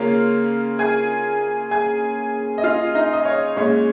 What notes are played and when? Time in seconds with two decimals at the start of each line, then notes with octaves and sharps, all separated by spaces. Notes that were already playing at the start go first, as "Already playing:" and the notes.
Already playing: C#3 A#3 C#4 F4 F5
0.79 G#4 G#5
1.71 G#4 G#5
2.58 D#5
2.64 F4 F5
2.95 D#4 D#5
3.13 D#5
3.25 C#5
3.56 A#2 G#3 C#4 C#5